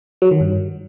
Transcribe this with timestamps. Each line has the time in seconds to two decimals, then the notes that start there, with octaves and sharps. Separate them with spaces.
0.22 F#3
0.31 D#3
0.41 G2